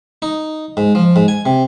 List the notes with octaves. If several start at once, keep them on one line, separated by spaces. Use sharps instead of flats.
D#4
G#2
F3
G#2
G#5
C3